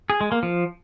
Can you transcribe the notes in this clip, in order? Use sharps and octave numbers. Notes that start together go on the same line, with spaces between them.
G#4
G#3
A#3
F3